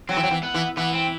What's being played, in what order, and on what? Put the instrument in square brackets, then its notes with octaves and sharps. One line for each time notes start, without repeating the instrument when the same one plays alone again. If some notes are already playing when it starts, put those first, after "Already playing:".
[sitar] F#3 [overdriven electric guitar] C4
[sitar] E3
F#3
E3
[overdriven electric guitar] B3
[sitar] E3
[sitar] E3 [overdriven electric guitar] B3
[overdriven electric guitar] C4